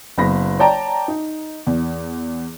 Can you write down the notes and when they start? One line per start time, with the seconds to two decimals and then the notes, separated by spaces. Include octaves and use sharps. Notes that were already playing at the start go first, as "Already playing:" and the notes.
0.18 F#1 B3 B5 A#6
0.59 C#5 D5 G5 A5 A#5
1.08 D#4
1.67 E2